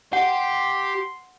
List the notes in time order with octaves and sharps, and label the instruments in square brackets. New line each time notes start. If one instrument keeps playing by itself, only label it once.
[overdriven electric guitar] G4 [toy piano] F#5 [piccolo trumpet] C6